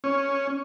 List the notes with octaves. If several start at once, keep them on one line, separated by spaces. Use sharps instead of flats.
C#4